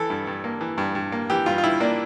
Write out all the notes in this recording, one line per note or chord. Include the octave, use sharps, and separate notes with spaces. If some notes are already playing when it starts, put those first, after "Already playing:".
Already playing: E3 A4
G2
G2
A#3
E3
G2
G2
A#3
E3 G4
G2 F4
F4
G2 E4
A#3 D4